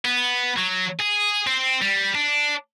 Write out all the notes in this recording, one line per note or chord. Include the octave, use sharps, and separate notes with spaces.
B3
F#3
G#4
C4
G3
D4